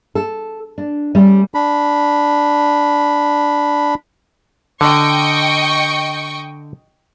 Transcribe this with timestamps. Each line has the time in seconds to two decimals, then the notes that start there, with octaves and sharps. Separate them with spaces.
0.15 A4
0.78 D4
1.15 G3 A3 C#4
1.54 D4 B5
4.81 D3 D#5 G5 C#6